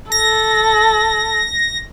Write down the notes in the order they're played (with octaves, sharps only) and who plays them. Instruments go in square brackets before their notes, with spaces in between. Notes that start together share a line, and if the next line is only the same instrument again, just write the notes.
[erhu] A4 [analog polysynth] A#6